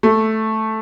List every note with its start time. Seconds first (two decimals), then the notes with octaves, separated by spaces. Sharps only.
0.03 A3